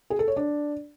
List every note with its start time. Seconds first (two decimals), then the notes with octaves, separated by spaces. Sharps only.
0.10 G#4
0.19 A4
0.28 C#5
0.37 D4